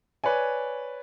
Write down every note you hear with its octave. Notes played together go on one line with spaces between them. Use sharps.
B4 C#5 D5 G#5